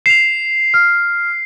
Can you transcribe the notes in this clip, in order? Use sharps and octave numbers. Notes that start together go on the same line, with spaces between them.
C7 E7 F7
F6